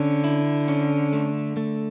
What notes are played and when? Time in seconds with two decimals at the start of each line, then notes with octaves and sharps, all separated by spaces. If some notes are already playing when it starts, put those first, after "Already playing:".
Already playing: D3 C#4
0.24 E4
0.68 C#4
1.13 A3
1.57 A3